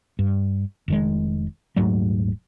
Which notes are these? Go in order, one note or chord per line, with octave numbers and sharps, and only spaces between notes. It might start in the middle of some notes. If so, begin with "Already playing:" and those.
G2
F1 D#3 G#3
D#1 G#2 F#3 A3